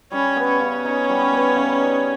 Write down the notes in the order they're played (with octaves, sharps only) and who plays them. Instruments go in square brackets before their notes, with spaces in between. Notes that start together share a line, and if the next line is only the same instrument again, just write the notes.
[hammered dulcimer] G3 [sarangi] C#4
[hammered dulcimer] B3
[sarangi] C#4
[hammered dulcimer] C#3
D#4
G3
B3
C#3
D#4